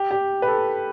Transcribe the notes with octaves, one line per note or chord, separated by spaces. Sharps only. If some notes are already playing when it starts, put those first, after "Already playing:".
Already playing: G4
G4
B4
A4